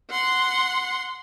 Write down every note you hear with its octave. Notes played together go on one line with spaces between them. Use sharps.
F#5 C6